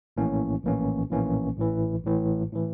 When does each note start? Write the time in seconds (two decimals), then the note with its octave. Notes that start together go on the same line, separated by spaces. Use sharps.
0.17 A#1 A2 E3 A#3 C#4
0.63 A#1 A2 E3 A#3 C#4
1.10 A#1 A2 E3 A#3 C#4
1.57 A1 A2 E3
2.04 A1 A2 E3
2.53 A2 E3